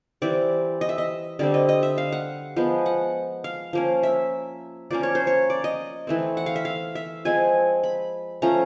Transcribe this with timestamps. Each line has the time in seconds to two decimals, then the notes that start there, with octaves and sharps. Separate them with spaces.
0.22 E3 G3 C4 D5
0.81 D#5
0.89 E5
0.98 D#5
1.39 D3 G3 C4 D5
1.54 D#5
1.69 D#5
1.83 E5
1.98 F5
2.12 F#5
2.56 F3 G#3 B3
2.86 F#5
3.44 F5
3.73 F3 A#3 C#4
4.03 E5
4.91 F3 A#3 C#4 D5
5.03 C#5
5.15 C5
5.27 C#5
5.50 D5
5.64 D#5
6.07 E3 A3 C4
6.37 F#5
6.46 F5
6.56 E5
6.65 F5
6.95 E5
7.25 F3 G#3 C4 G#5
7.84 B5
8.42 F3 A3 C#4 A#5